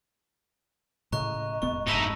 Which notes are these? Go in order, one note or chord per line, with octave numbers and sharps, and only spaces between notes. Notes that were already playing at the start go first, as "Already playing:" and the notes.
A2 C#3 D#5 A#5 C#6 F#6
E1 B3 C#6
F1 G#2 D#4 E4 A5 E6 A#6